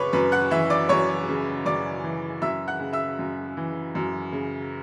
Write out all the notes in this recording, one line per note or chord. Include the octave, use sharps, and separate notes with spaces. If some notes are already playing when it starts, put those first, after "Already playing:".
Already playing: F#2 C#3 B4 C#5 B5 C#6 D6
F#2 B4 B5
F#5 F#6
E3 E5 E6
D5 D6
F#2 C#5 C#6
C#3
F#2 D5 D6
E3
F#2 E5 E6
F#5 F#6
C#3
E5 E6
F#2
E3
F#2
C#3